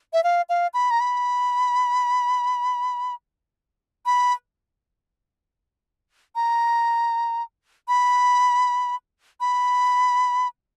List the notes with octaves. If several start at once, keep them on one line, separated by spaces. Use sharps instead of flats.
E5
F5
F5
B5
A#5
B5
B5
A#5
B5
B5